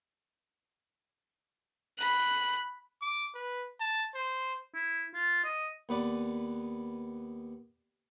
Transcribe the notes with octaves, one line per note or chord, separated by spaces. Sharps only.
B5 F#6
D6
B4
A5
C5
E4
F4
D#5
D#2 B3 B4 D5